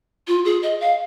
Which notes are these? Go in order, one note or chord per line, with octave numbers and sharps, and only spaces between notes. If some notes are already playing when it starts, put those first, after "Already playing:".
F4
G#4
D#5
F5